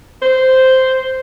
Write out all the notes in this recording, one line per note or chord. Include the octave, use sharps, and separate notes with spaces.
C5